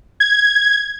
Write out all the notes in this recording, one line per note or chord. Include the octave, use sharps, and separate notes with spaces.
G#6